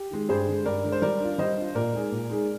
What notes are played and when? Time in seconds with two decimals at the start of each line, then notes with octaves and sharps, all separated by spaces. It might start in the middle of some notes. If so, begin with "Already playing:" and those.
Already playing: G4
0.10 D#3 G#3
0.29 G2 G#4 C5
0.47 D3 G#3
0.66 G2 A#4 D5
0.84 D3 G#3
0.92 C5
1.02 G3 A#4 D5
1.20 D4 F4
1.38 G3 C5 D#5
1.57 D4 F4
1.75 A#2 A#4 D5
1.93 G#3 D#4 G#4
2.12 A#2
2.30 G#3 D#4 G#4